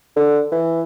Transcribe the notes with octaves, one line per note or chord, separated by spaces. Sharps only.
D3
E3